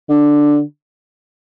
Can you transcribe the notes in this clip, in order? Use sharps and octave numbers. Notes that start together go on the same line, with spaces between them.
D3